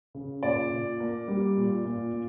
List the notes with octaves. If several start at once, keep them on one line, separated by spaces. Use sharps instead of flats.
C#3
A#2 D5
A#2
A#3
G3
A#2
A#2
A#2